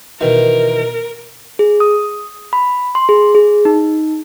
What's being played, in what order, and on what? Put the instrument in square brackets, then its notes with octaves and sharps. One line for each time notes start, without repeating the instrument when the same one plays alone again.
[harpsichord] B2 D#3 E3 [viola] A#4
[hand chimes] G#4
D#6
B5
C6
G#4
G#4
D#4